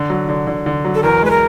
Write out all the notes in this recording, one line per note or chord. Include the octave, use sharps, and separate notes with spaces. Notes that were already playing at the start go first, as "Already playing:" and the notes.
Already playing: D3
F#3
D3
D3
D3
F#3
A4
E2 A#4
G#3 B4
A#4